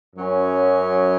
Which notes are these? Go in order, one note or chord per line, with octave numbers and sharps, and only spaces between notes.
F#2 F#3 C#4